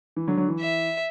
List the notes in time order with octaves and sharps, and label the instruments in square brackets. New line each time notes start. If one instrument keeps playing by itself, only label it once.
[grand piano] E3
D3 F#3
D3 F#3
E3
[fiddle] E5